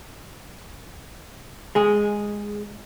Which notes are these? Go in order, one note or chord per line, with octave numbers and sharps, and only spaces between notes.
G#3 G#4